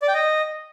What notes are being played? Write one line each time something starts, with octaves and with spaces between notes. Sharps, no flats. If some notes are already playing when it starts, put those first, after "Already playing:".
D5
G5
D#5